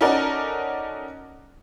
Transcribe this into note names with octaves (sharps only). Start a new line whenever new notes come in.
C#4 D#4 F#4 A4 A#4 D5